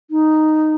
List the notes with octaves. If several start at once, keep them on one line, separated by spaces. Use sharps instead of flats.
D#4